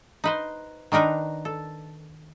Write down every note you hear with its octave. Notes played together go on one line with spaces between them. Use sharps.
D#4 B4 C5
D#3 D4 D#4 A#4 B4
A4